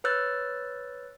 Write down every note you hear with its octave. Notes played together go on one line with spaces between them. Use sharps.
B4 C#5 E6 F#6 G6 A6